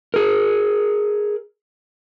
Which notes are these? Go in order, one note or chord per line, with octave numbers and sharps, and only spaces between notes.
G#4 A#4